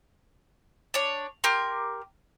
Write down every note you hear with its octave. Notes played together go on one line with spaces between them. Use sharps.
D4 C#5
G4 A#4 C6